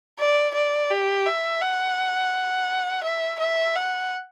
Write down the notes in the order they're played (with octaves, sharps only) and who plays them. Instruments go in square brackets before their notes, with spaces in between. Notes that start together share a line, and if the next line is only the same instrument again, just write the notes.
[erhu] D5
D5
G4
E5
F#5
E5
E5
F#5